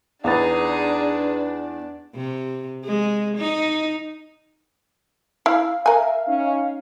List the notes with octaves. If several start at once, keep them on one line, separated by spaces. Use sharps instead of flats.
E2 D4 D#4 G#4 B4 A6
C3
G#3
D#4
E4 F5
A#4 E5 G#5
C#4 D#4